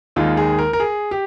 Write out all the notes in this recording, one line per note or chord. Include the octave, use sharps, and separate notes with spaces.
D#2 D#3 G#3 D#4 F4
G#4
A#4
A#4
G#4
G4